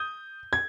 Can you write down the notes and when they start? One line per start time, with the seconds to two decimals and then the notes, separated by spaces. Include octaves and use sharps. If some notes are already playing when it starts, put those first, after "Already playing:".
Already playing: D#6 G6
0.53 G#6